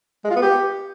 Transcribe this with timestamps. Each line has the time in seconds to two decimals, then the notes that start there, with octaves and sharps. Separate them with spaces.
0.25 G#3
0.30 F4
0.36 B3
0.42 G4